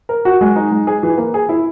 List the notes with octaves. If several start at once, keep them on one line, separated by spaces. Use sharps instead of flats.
A#4
F#4
G#3
D#4
G#3
G#4
E3
A#3
G#4
E4